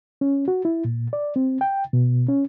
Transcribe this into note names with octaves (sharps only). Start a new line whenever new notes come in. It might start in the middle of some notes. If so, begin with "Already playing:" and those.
C#4
F#4
E4
A#2
D5
C4
G5
B2
C#4